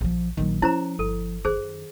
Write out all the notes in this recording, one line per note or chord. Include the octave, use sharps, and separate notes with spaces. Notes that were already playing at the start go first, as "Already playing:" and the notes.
A#1 F3 G3
A#1 D#3 F#3
F3 C#4 E4 C5 A#5
G1 A4
F#2 D#3 G#4 C5